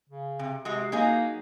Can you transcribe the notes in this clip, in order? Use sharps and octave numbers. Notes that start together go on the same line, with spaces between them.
C#3
C3
C3 G#3 F#4
F#3 A#3 D#4 G#4